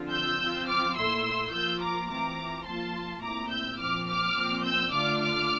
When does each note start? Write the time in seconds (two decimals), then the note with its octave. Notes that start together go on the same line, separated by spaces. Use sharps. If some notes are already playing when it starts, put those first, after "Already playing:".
Already playing: D3 F3 C4 F4
0.11 E6 G6
0.40 F3 C4 F4
0.68 D6 F6
0.96 A#2 A3 E4 C6 E6
1.52 F3 A#3 F4 E6 G6
1.81 A#5 D6
2.09 E3 A3 C4 F4 A#5 D6
2.66 F3 A#3 F4 A5 C6
3.22 A#2 A3 C4 E4 A#5 D6
3.51 E6 G6
3.79 A#2 F3 C4 D6 F6
4.07 D6 F6
4.36 A#2 F3 C4
4.64 E6 G6
4.92 D3 A3 D4 F4 D6 F6
5.20 D6 F6